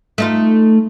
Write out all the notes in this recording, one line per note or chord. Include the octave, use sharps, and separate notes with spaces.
A3 D#4 F4